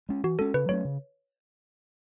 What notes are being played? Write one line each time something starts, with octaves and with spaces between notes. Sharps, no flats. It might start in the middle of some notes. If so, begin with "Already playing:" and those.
G#3 C#4
E3 F#4
G#3 C#4 A4
C#3 B4
F#3 A3 C#4 C#5
C#3